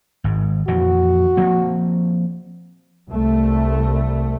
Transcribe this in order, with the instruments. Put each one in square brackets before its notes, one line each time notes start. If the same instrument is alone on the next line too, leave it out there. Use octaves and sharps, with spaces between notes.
[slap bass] G#1 G#2
[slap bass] F2 A#2 E3 [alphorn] F#4
[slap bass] F3 A#3 C4
[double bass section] C2 A3